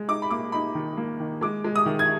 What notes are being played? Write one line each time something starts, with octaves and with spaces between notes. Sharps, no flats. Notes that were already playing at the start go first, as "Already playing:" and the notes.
Already playing: G#3
D#4 D6
B5
A#3 D6
D#4 B5
D#3
A#3
D#3
G#3 D6
G#3
D#6
D#3
G#6